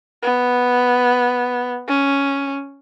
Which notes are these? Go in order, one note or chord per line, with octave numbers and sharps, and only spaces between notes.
B3
C#4